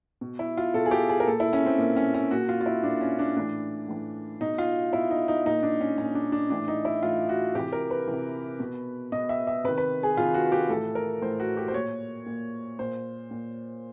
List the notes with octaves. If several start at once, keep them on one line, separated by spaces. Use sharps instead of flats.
B2
E4
F4
B2 A4
G#4
G4
G#4
A#4
A#2 A4
E4
C#4
C4
A#2 A#3
C#4
C#4
A#2 F#4
F4
F4
E4
A#2 D4
C#4
D4
A2 E3 D4
A2 E3
B2 D#4
F4
B2 E4
D#4
D#4
A#2 D#4
D4
C#4
A#2 C#4
D4
D4
A2 E3 D4
D#4
E4
A2 E3 F4
F#4
C3 E3 G4
A#4
B4
C3 E3
B2
B2 D#5
E5
E5
C3 D#3 B4
B4
G#4
C3 D#3 F4
F#4
G4
A2 E3 A4
A#4
A2 E3 C5
F#4
G4
C5
A#2 C#5
A#2
A#2 C5
A#2